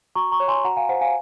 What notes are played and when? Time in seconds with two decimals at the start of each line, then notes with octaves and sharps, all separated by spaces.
0.16 F#4 A#5 C#6
0.31 A#5 C#6
0.40 C#5
0.48 G#5 C6
0.65 F#4 F#5 A#5
0.77 F5 G#5
0.89 C5 F#5
1.01 F5 G#5